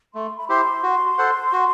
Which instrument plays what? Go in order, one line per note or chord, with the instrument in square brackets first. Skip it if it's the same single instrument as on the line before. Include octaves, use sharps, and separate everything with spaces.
[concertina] A3 [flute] C6
[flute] B5
[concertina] E4 G4 C5 [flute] C6
[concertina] F#4
A4 C5 F#5
F#4